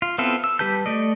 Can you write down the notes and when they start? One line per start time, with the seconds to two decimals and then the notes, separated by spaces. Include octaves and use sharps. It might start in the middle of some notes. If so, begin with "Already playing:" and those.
0.02 F4
0.18 B3 C4 E4 F4 A4
0.44 E6
0.59 G3 G4 B4 A5 G6
0.86 A3 D5 D#5